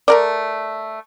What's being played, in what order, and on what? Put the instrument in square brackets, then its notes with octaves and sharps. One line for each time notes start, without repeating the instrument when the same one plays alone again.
[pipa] A3 A#4 D5